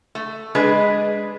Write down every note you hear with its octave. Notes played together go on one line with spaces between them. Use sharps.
A3
G#3 D4 G#4 B4 D#5